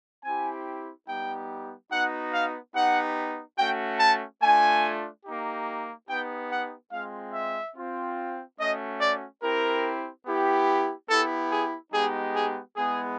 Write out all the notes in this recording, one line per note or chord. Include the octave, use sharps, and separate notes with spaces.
C4 E4 G4 G#5
G3 B3 D#4 G4 G5
B3 D#4 F#4 F#5
F5
B3 D#4 G4 F#5
A3 C#4 F#4 G5
A5
A3 D4 F4 G#5
A#3 D#4 G4
B3 D#4 G4 G5
F#5
G#3 C4 F4 F5
E5
C4 F4
A3 C#4 F#4 D#5
D5
C4 E4 G4 A#4
B3 E4 G4
B3 E4 G4 A4
G#4
G#3 B3 D#4 G4 G#4
G#4
G#3 B3 E4 G#4